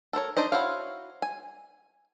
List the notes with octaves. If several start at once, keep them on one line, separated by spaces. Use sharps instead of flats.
A4 A#4 C5 C#5
D4 D#4 C5 D#5
E4 F#4 C5 C#5 F5
G#5